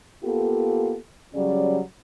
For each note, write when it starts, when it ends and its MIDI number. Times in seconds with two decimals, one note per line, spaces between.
0.23 0.95 58
0.23 0.95 59
0.23 0.95 65
0.23 0.95 67
0.23 0.95 69
1.35 1.79 49
1.35 1.79 54
1.35 1.79 55
1.35 1.79 61
1.35 1.79 74